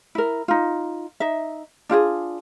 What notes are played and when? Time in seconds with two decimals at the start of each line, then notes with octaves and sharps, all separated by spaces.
0.15 E4 A#4
0.48 D#4 F4
1.20 D#4 E5
1.89 D4 F4 G4 G#4